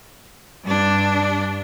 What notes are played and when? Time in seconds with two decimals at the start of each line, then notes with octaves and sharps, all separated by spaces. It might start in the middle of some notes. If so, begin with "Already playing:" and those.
0.64 G2 D4